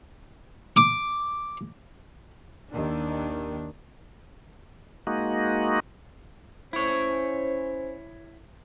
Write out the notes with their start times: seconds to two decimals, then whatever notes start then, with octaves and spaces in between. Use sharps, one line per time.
0.76 D6
2.72 D#2 D#3 D4
5.07 G#3 A#3 D#4 F#4
6.73 C#4 E4 C5 C#5